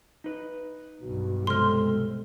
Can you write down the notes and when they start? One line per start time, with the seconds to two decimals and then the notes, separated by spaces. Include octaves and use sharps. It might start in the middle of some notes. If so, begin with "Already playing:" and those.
0.24 D#4 B4
1.02 B1 G2 F#4
1.47 C3 G#3 A4 C5 C6 F6